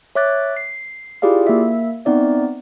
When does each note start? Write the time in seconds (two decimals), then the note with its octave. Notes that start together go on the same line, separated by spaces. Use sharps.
0.15 C#5 E5 D6 F#6 A6
0.57 C7
1.22 E4 F4 G4 G#4 D5 F5
1.47 A#3 E5
2.05 B3 C4 D#4 D5 E5